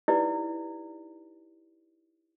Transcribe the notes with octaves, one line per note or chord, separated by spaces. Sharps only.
D#4 E4 G4 B4 D5